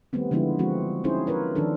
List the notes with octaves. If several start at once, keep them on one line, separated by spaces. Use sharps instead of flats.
D#3 G3 A3 B3 C4
D3 F3 G#3 B3 E4 F4
F3 F#3 G#3 C4 F#4
C4 C#4 D#4 E4 G#4 C5
F4 A#4 B4 C#5
D#3 F3 D4 A4